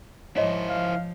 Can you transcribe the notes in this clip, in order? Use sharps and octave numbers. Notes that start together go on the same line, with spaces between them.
G#2 F3 E4 C5 C#5 D#5
F3 F5